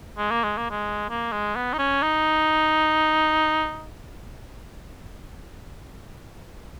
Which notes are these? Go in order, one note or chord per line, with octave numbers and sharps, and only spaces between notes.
G#3
A#3
G#3
A#3
G#3
A#3
G#3
B3
D#4
C#4
D#4